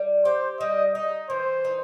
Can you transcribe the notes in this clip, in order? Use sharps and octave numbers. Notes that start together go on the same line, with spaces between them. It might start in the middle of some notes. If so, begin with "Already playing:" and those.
Already playing: G3
G4 C5
G3 D#5
D#4 D#5
E3 C5
D#4